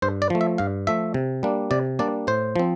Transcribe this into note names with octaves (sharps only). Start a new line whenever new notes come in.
G2 C5
D5
F3 A3
E5
G2 F5
F3 A3 E5
C3
G3 A#3 D4
C3 D5
G3 A#3 D4 D5
A2 C5
F3 C4